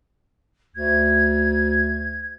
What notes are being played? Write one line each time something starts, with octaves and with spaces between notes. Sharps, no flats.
D2 G#6